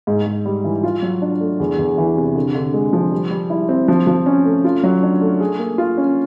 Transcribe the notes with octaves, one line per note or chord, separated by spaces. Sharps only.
G#2
G#2
G3
E3
F4
F#3
D4
A3
E2
E2
E3
C3
D3
D3
G#3
F3
G3
G3
E4
C4
F3
F3
C#4
A3
F4
F#3
D4
A3
G#4
A#3
F4
C#4